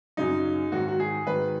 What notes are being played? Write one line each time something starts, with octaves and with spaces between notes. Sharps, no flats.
F#2 C#3 F#3 D#4
G#2 D#3 F#3 F#4
F#4
G#4
G#2 D#3 F#3 B4